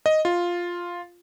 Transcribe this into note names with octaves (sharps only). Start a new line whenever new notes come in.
D#5
F4